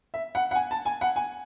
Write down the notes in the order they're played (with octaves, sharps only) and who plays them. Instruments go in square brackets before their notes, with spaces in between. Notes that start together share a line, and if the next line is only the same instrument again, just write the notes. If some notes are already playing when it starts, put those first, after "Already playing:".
[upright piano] E5
F#5
F#5
G#5
A5
G#5
F#5
G#5